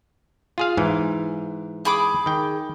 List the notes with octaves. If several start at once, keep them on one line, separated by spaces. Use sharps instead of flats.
F4 G#4 F5
G#2 E3
G#4 B5 D6
D#3 G5